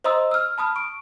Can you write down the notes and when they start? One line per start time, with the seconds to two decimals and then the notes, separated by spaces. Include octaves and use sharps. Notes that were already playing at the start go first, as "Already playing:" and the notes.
0.04 C5 D#5 A#5 C6 D#6 E6
0.31 E6 F6
0.58 A5 B5 D#6 F6
0.76 C#6 D7